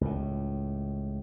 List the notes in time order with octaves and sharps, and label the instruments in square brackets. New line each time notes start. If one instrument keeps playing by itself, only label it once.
[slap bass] C#2 A2